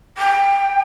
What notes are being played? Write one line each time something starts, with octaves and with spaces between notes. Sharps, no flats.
G5